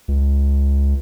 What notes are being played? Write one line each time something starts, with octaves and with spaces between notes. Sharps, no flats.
C#2